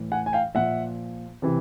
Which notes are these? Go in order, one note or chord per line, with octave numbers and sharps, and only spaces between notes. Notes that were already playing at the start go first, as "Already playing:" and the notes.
Already playing: A2 E3
F#5 G#5
G#5
F5 G5
A#2 F3 E5 F#5
C3 E3